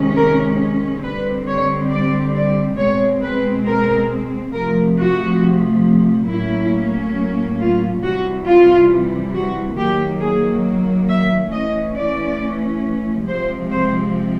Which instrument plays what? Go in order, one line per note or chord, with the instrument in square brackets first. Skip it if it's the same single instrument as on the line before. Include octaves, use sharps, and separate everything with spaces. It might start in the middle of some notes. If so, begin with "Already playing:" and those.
Already playing: [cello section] C3 D#3 G#3 C#4
A#4
D3 G3 C4 B4
C#5
D5
D5
B2 G#3 C4 C#5
B4
A#4
C3 F3 A3 A#4
F#4
A2 F#3 A#3 C#4 E4
F4
C3 E3 G3 F#4
F4
F#4
D#3 F#3 A#3 G4
G#4
E5
E3 A3 C#4 D#5
D5
C3 F3 G#3 C4 C5
C5